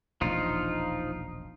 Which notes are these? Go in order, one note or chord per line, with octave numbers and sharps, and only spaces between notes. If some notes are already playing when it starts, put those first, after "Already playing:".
E1 A#1 F3 D4 D#4 F4